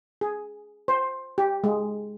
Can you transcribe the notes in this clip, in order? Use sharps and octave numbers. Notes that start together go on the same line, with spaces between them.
G#4
C5
G4
G#3